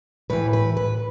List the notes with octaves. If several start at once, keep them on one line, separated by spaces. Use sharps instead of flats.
A2 E3 B4
B4
B4